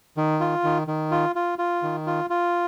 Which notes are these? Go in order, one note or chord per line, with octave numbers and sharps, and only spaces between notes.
D#3
F4
D#3
D#3
F4
F4
F4
D#3
F4
F4